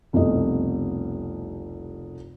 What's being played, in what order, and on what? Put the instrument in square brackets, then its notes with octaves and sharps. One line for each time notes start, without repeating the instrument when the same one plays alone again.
[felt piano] F1 C2 B2 A3 D#5